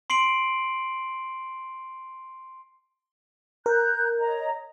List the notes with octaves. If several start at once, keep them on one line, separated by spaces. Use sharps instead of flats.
C6 C7 D7 F#7
A#4 A#5 F#6 G6
C#5 D#5 A#5